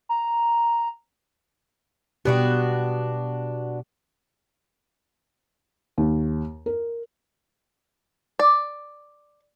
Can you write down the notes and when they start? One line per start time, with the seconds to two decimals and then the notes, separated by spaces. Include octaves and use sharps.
0.09 A#5
2.25 B2 B3 D4 F#4 G4
5.98 D#2
6.66 A#4
8.39 D5